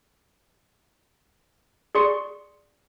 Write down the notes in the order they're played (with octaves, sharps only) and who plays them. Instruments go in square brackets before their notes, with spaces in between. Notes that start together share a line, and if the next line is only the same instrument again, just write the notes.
[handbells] G#4 D5 C6 C#6 C#7